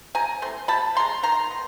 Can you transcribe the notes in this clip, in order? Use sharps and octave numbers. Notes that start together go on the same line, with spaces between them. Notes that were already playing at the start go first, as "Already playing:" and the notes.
C3 G#5 A#5
E3 A3 C4 C6
C3 A5 B5
D#3 A#5 C6
G#3
D#3 A#5 C6
B3